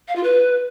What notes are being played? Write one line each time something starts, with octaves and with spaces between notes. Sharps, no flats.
F5
F4
B4